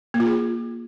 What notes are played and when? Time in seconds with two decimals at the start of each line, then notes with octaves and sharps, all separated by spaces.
0.14 A#3
0.20 F4
0.26 G#4